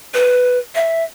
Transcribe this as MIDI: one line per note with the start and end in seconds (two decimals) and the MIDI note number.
0.14 0.58 71
0.75 1.04 76